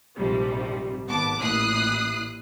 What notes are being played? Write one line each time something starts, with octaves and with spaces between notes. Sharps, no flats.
A#1 G#2 C3 F3 G3
G#1 B3 A5 D6
A1 A#2 E4 D#6 F#6 C7